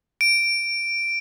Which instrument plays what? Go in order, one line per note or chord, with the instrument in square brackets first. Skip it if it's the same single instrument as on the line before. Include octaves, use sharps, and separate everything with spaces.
[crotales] D7